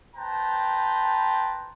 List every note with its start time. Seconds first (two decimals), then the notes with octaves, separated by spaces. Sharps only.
0.16 B4 C5 G5 A5 A#5